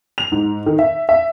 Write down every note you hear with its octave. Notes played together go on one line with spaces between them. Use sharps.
F7
G#2
D#3
E5
E5